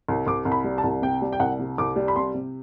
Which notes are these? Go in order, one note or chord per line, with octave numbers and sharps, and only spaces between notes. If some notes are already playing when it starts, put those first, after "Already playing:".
C2
C2 D6
C2
B5
G3
A5
C2
C3 G5
G3
G5
C2 F#5
C3
C2 D6
G3
B5
C3 C6
C3